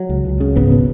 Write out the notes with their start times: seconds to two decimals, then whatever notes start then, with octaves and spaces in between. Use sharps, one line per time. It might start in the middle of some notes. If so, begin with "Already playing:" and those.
Already playing: F#3
0.09 C#2
0.25 C#2
0.40 C#3
0.56 G#2 B3
0.71 B2